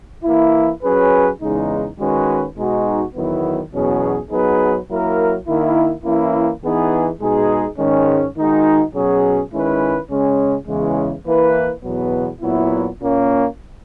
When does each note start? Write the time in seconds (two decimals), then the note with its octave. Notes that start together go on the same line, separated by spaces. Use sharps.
0.25 E3 A#3 E4
0.83 F#3 C#4 G#4 B4
1.41 E2 C#3 G#3 D#4
1.99 D#3 G#3 C#4 F#4 B4
2.57 B2 G#3 D#4 F#4
3.15 E2 D#3 F#3 B3 E4
3.72 E2 B2 F#3 C#4 G#4
4.30 F#3 B3 D#4 G#4 B4
4.89 F#3 A#3 E4 A#4
5.47 D#3 A#3 E4
6.04 E3 A#3 C#4 E4
6.63 E3 B3 D#4 G#4
7.20 B2 G#3 D#4 G#4
7.78 G#2 D#3 G#3 C#4
8.36 D#3 G#3 D#4 F#4
8.95 B2 F#3 C#4 G#4
9.52 D#3 G#3 C#4 E4 B4
10.10 C#3 G#3 C#4
10.68 E2 C#3 E3 G#3 C#4
11.25 E3 A#3 E4 B4
11.84 E2 B2 F#3 B3
12.41 A#2 F#3 B3 E4
13.00 A#2 A#3 C#4